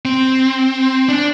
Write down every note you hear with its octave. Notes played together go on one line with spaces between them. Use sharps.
C4
D4